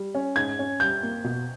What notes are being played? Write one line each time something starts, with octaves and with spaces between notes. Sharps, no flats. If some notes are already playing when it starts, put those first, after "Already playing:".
Already playing: G3
C#4
G#2 G#6
C#4
G3 G6
A#3
B2